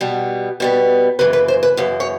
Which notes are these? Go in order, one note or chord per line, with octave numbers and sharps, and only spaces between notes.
B2 G3 B3
B2 G3 B3
F#2 C#3 E3 B4
B4
C5
B4
F#2 C#3 E3 B4
C#5